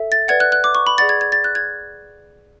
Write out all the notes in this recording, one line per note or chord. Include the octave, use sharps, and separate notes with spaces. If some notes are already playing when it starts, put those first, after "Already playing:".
Already playing: A4 E5
A6
B4 D5 F#5 G#6
F#6
F#6
D6
C#6
B5
G#4 D5 F#5 A6
G#6
G#6
A6
F#6
G#6